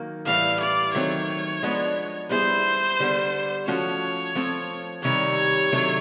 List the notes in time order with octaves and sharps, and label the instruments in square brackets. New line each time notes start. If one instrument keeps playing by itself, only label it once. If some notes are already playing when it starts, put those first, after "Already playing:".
Already playing: [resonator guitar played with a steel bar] D#3 F#3 A#3
[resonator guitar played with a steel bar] A2 E3 G3 [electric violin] F5
[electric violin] D5
[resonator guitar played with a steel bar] D#3 F#3 A3 C4 [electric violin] C#5
[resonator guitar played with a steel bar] F3 G#3 B3 D4
[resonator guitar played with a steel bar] G3 B3 E4 G#4 [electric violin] C5
[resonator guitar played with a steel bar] D3 G3 B3 D4
[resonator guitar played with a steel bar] F3 A3 C#4 F#4 [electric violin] C#5
[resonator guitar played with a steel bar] F3 A3 C4
[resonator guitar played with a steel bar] C3 D#3 G3 [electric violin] C#5
[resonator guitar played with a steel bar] C3 D#3 F#3 A3 D4